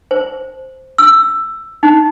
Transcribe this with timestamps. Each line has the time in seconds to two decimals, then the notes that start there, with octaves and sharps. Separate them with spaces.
0.11 C5
0.98 E6
1.83 D#4